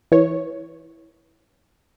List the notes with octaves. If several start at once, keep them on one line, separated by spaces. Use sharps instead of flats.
E3 C#5